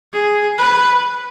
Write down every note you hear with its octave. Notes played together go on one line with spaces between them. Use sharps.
G#4
B4